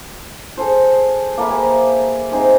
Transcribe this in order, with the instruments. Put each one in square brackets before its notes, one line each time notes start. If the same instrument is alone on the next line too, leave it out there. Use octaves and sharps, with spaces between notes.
[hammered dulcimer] G#4 A4 C5
A#3 A4 B4 E5
G4 G#4 C5
C4 D#4 G#4 C5